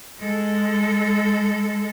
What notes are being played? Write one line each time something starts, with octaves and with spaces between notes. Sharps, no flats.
G#3 A4